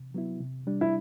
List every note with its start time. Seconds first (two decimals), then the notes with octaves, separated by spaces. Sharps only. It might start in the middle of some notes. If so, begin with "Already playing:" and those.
Already playing: C3
0.14 F#3 B3 E4
0.40 C3
0.67 G3 D4
0.81 E4